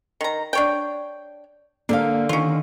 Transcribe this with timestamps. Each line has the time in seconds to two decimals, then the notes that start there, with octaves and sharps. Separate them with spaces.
0.21 D#3 A#5
0.53 D4 C#5 G5
1.89 D3 A#3 D4 G4 F5
2.29 D#3 C#4 F4